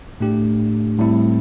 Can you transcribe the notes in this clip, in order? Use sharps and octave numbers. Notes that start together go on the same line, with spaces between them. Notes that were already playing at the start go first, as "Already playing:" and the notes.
A2 A3 D4 G4
A2 G3 C4 E4